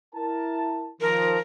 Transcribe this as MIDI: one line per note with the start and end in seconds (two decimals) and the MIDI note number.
0.15 0.92 64
0.15 0.92 70
0.15 0.92 81
1.01 1.38 51
1.01 1.38 53
1.01 1.39 70